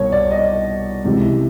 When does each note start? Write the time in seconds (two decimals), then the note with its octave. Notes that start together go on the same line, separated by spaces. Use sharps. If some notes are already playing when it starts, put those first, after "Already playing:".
Already playing: C2 B2 C#5
0.12 D5
0.31 D#5
1.04 C#2 C3 E3